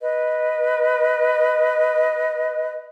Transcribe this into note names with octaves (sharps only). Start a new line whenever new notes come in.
B4 D#5